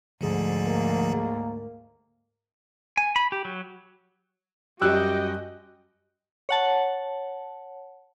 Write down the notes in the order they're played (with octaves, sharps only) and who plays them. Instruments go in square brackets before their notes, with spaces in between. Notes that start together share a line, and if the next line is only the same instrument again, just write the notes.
[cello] D2 G#2 [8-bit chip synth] D3 F3 G#4
[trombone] A#3
[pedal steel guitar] G#5
B5
G4
F#3
[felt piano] F#2 G3 [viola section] F#4 D#5 G5 [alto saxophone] G4 [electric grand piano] E6 F#6
[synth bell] C#5 F#5 A5